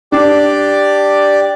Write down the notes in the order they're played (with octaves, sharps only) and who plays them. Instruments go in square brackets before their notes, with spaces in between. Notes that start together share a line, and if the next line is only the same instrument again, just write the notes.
[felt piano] D4 [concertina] G4 D5